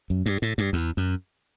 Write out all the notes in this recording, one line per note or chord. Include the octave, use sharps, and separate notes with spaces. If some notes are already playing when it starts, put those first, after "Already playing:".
F#2
G2
A2
G2
E2
F#2